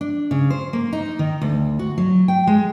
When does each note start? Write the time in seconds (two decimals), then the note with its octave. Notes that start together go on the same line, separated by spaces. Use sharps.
0.01 D4
0.31 C#3
0.50 C5
0.73 A#3
0.93 D#4
1.19 D#3
1.42 D2
1.79 F#4
1.98 F#3
2.28 G5
2.47 G#3